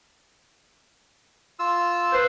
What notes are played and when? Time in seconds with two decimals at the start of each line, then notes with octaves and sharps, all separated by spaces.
1.59 F4 E6
2.13 B4 C5